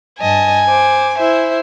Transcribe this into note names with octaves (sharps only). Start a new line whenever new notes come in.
G2 D#5 G#5 A5
C5 D6
E4 C5 E5